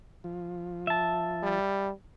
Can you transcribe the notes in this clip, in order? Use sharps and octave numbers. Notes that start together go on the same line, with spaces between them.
F3
E5 A5
G3